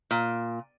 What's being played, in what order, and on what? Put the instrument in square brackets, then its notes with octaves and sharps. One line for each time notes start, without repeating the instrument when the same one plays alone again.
[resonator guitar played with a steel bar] A#2